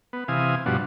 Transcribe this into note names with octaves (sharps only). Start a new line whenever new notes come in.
B3
C3 E3 F5 G#5 D#6
G2 B2 F3 D4 F#4